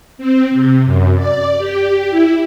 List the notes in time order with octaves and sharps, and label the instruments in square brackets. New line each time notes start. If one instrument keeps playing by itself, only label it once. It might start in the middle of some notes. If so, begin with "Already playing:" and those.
[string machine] C4
C3
F#2
D5
G4
E4